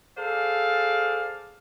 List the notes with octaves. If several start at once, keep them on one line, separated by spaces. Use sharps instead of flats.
G#4 A4 C5 D5 F5